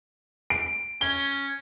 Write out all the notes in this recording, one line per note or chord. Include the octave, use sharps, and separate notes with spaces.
D7
C#4 G7